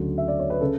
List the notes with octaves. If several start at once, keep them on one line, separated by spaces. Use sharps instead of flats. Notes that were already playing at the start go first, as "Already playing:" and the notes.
Already playing: D2 C#3 F#3
E5
D5
C#5
B4
C#3 A4